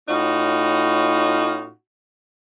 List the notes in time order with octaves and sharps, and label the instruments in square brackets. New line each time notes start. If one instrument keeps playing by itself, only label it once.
[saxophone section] A2 C#4 D#4 F4 F#4